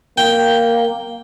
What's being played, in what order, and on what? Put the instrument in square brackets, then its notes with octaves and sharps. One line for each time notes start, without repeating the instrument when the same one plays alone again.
[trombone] A#3 [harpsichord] G5